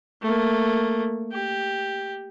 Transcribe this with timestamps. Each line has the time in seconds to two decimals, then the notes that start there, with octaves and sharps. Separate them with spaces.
0.22 A3 A#3
1.32 G4